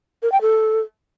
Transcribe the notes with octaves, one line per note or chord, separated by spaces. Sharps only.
A#4
G5
A4